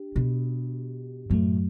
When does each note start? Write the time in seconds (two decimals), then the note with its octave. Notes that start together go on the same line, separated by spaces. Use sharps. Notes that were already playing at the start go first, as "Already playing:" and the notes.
Already playing: D4 G4
0.16 B2
1.30 F#2 A2 F#3 A3